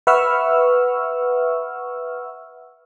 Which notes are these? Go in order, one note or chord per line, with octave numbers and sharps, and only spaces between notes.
B4 E5 F#5 C#6 E6 F6